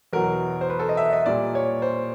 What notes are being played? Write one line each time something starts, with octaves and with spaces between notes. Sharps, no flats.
E2 B2 F#3 A#4
C5
B4
A4
D#5
E5
D#5
A#2 G3 D5
C#5
C5